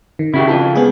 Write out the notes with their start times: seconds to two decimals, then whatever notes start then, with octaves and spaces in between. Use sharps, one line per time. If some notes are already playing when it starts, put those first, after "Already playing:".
0.19 D#3
0.34 C#3 E4 F#4 G4
0.48 F4 A4
0.75 C#2 B3 G#4